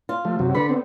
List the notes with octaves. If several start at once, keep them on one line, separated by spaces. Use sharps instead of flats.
F4
F3 A3
F#2 C3 F#3
D3 B4 B5
B3 C4